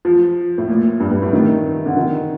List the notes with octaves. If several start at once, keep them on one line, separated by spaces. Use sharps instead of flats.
F3
A2
A#2
G2
G2
A2
D#3
D3
D#3